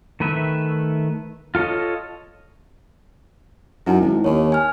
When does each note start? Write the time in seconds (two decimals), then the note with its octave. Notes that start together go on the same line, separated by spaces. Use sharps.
0.20 D#3 A3 B4 E5
1.55 F4 A4 C#5 D#5
3.86 F#2 D#4 E4
4.01 G#1
4.24 D#2 C#5
4.52 G#5 F6